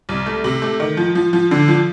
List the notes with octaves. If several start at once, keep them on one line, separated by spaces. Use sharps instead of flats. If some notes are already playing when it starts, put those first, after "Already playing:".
C2
A3
C3
A3
D#3
F3
F3
F3
D3
F3